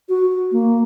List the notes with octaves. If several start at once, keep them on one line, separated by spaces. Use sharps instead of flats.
F#4
A#3